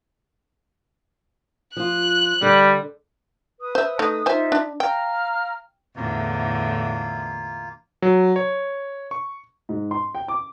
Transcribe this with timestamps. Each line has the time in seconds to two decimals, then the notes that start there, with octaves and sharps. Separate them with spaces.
1.77 F3 F4 F#6
2.42 D3 G3
3.59 B4 D#6
3.75 C5 E5
3.99 A3 D#4
4.26 D#4 F4 C5 E5 G#5
4.52 D4
4.80 F5 G5 A#5 F6
5.96 E2 A2 D3 A#3 F4
8.02 F#3
8.36 C#5
9.11 C#6
9.69 G#2
9.91 C6
10.15 G5
10.28 D6